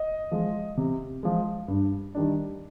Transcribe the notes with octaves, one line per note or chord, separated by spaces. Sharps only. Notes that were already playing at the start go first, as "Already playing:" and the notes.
Already playing: D#5
F3 G#3
C3
F3 G#3
G2
D#3 G3 D4